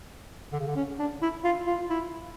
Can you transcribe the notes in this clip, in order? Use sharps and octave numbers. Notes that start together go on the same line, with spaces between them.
D3
C#3
D3
C#4
D4
E4
F4
F4
E4